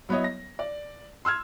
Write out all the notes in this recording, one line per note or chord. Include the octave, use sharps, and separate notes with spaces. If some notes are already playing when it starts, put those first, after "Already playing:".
F#3 B3 E4 C#5 D#5
A#6
D5
C6 E6 F6 G#6